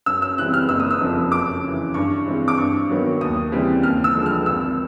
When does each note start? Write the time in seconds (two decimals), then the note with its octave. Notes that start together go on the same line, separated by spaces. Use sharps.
0.06 F#2 E6
0.22 E6
0.38 C#3 E3 G3 C4 F#6
0.54 F6
0.69 F#1 E6
0.80 D#6
0.91 E6
1.01 F2 C#3 F3
1.32 F#2 D6
1.64 C#3 E3
1.94 G2 C#6
2.26 E3 G#3 C4
2.48 D6
2.57 G2 C#6
2.89 D#3 F#3 B3
3.21 D#2 D#6
3.52 C#3 E3 G3 C4
3.83 D#2 F6
4.04 E6
4.15 D3 F3 G#3
4.26 F6
4.46 G#1 E6